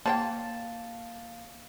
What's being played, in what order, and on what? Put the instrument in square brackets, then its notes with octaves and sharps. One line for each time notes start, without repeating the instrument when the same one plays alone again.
[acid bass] A#3 [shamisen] C5 C#5 G5 [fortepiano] A5